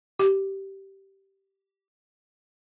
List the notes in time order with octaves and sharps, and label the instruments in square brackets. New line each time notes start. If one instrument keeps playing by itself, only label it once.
[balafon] G4